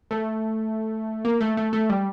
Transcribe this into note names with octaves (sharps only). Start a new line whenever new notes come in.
A3
A#3
A3
A3
A3
G3